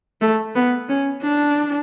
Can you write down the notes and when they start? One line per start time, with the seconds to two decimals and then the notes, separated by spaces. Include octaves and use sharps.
0.21 A3
0.55 B3
0.89 C#4
1.23 D4